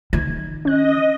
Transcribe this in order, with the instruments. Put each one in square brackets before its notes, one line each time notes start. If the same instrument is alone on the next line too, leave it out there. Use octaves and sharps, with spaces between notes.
[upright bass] D#3 [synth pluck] G#6
[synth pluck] C#4 F#6 [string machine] D#5